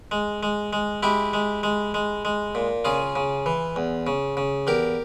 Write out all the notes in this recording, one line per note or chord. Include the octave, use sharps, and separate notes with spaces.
G#3
G#3
G#3
G#3 E4 G4
G#3
G#3
G#3
G#3
A#2
C#3 F4 G#4
C#3
E3
E2
C#3
C#3
E2 G4 A#4